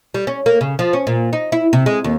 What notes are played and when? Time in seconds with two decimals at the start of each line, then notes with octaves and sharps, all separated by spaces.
0.14 G3
0.27 C#4
0.46 A#3
0.61 C#3
0.79 F3
0.93 C#4
1.07 A#2
1.33 D#4
1.52 E4
1.73 C3
1.86 G#3
2.04 D#2